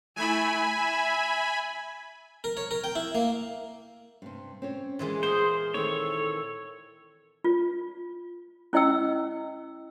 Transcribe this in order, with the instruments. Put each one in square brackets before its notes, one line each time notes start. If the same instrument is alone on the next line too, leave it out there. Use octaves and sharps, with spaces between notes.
[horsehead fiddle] A3 E4 [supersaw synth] G#5 B5
[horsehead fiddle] E5
[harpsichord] A#4
C#5
A#4
G5
E4
A#3
[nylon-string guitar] G2 C3
C4 C#4 C#5
[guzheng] A#2 E3 G#3
[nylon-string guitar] B3 [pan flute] G#4 [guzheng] A#4 [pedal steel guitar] C5
[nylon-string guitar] D#3 C4 E4 [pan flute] A4 [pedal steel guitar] C#5
[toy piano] F4
C#4 E4 D#5 G5 E6